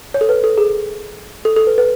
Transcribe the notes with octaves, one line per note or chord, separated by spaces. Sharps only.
C#5
A4
B4
A4
G#4
A4
A4
B4
B4